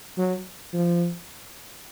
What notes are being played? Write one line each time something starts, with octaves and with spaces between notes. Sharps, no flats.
F#3
F3